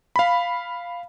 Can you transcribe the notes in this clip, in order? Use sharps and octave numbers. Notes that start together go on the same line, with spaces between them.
F5 B5